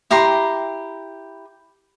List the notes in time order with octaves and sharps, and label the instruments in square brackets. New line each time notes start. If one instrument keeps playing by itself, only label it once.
[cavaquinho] E4 G4 A#5 C6